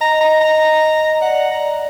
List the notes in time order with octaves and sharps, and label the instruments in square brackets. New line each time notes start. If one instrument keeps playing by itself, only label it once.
[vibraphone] D#5 [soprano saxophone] A#5
[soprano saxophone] A#5
A#5
[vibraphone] D5 [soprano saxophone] F#5
[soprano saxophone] A#5